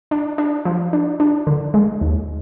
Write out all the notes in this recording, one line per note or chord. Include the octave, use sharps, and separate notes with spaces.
D4
D4
F3
D4
D4
D3
G#3
D#2